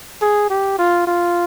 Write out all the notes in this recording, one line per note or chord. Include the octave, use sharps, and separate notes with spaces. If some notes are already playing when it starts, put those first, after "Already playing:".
G#4
G4
F4
F4